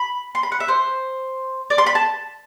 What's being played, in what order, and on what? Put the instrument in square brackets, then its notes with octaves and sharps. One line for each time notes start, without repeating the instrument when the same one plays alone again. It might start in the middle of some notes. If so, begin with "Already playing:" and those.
Already playing: [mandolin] B5
C6
B5
F#5
E5
C5
D5
C6
B5
A5